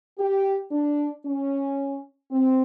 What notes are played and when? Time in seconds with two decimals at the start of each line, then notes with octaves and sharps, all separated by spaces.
0.19 G4
0.71 D4
1.25 C#4
2.31 C4